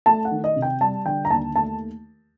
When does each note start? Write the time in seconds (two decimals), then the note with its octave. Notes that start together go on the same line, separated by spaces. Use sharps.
0.06 A3 A5
0.25 F#5
0.31 D#3
0.44 D#5
0.56 C3
0.62 G5
0.81 G3 A5
1.06 D3 G5
1.25 A#5
1.30 D#2 A5
1.55 A3 A5